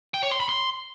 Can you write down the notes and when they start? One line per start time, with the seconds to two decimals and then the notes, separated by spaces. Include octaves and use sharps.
0.14 G5
0.23 C#5
0.31 C6
0.40 B5
0.49 C6